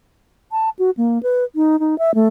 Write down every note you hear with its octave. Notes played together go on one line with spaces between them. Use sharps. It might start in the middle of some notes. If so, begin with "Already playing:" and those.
A5
F#4
A#3
B4
D#4
D#4
E5
A3